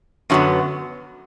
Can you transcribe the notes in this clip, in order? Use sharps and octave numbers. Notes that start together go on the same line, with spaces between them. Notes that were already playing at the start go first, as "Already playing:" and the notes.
F#2 D3 F#3 B3